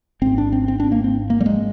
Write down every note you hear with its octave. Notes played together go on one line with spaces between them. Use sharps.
G#1 G#2 C4
D4
C4
C4
D4
A#3
C4
A#3
G3
G#3